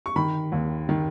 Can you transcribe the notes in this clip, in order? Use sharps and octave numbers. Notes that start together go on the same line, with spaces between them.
C#6
D#3 B5
D#2
D#3